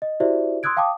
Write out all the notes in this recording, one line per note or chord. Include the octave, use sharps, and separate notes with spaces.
D#5
E4 F#4 G4 C5 D5 E5
C6 D#6 E6 F#6 G#6 D7
F5 G5 A5 D6 D#6